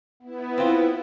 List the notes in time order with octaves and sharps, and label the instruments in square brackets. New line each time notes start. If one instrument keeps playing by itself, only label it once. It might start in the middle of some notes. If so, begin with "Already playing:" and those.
[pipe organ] B3 [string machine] E4
[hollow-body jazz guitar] C4 F4